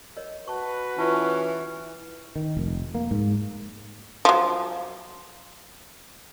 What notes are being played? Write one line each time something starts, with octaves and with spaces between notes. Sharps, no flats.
A#4 C#5 D#5
F#4 B4 A5 C#6
E3 C#4 F4 A5
D#3
F1
A#3
G#2
F3 F#3